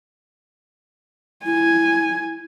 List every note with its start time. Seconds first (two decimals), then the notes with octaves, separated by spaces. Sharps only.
1.45 E4 G#5